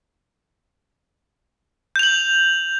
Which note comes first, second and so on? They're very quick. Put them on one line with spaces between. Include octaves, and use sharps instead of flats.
G6 F7 F#7